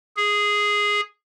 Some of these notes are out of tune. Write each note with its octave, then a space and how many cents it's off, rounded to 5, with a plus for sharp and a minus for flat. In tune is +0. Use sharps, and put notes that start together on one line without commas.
G#4 -5